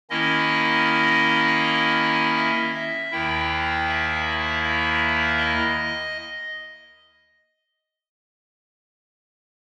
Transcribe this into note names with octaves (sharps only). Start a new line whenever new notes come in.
D#3 A#3 C#4 E4 D#5
E5
E5
D#2 D#3 A#3 E4 G5
E5
E5
D#5